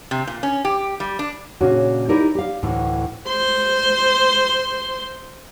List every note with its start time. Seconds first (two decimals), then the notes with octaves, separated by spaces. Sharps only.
0.11 C3
0.27 A#2
0.43 C#4
0.65 G4
1.00 G3
1.19 D4
1.61 A#2 C#3 C#4 D4 F#4
2.09 D#4 E4 G4 A#4 D5 E5
2.35 G4 F5
2.63 D2 A2 D3 E3
3.28 C5 C6